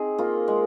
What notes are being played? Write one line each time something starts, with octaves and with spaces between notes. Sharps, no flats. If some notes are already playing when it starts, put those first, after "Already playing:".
Already playing: C4 D#4 G#4
A#3 F4
G#3